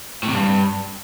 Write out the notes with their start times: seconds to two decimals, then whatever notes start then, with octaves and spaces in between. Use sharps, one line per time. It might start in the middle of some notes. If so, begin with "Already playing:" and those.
0.23 A2
0.28 C3
0.34 G2